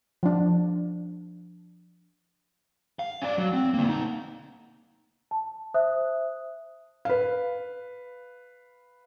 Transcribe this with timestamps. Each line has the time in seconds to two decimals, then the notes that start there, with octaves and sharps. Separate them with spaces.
0.23 F3 D4
2.99 F5
3.22 C#4 D5
3.38 F#3
3.53 C4
3.74 D3 A#3
3.88 B1 D#4
5.31 A5
5.74 C5 E5 D#6 F#6
7.05 B4 F5